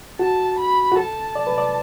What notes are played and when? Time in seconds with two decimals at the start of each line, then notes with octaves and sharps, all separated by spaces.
0.19 F#4 A5
0.58 B5
0.92 F#4
0.97 A4 A5
1.35 D5
1.47 B4
1.58 D5